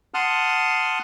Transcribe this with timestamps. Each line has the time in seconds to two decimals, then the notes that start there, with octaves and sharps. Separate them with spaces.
0.14 F#5 A5 C6 D#6 F6 F#6